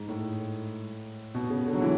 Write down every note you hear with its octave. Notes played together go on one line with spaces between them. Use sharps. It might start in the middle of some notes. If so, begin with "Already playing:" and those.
Already playing: G#2
A2
B2
C#3
D3
F#3
E3